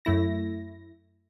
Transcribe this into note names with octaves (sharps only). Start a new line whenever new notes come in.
F#2 A3 E4 A#6